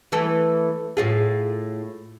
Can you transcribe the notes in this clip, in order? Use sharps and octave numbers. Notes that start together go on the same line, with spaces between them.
E3 A3 A4
A2 F4 G#4